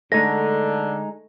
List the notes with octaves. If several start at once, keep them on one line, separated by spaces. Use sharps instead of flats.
D3 G#3 A3 D#4 A#6